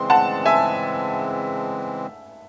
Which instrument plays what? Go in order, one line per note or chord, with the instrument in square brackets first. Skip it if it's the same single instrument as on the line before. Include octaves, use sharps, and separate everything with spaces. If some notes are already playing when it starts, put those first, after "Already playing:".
Already playing: [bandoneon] C#3 E3 G#3 C4 [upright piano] C6
[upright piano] F#5 A5
E5 G#5